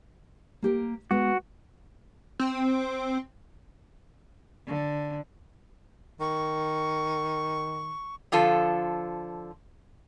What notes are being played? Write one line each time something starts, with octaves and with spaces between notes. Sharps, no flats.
A#3 G4 A#4
G#3 B3 F#4
C4
D3
D#3 C#6
D3 F3 F4 A4